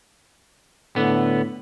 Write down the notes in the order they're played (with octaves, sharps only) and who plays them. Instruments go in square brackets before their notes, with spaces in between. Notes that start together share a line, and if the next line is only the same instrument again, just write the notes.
[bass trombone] A2 [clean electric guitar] D3 B3